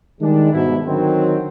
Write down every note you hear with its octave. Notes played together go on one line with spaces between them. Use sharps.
D#3 G3 G#3 D4
G#2 B2 E4
D3 D#3 F#3 C4